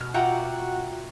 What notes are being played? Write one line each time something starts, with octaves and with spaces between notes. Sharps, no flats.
B2 F6
F4 F#4 E5 F#5 G5 A#5 D6